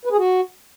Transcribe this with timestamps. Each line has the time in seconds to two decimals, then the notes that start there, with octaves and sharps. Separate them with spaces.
0.05 B4
0.11 G#4
0.18 F#4